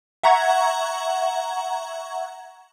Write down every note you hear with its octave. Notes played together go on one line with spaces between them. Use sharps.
E5 F#5 A#5 C#6 G#6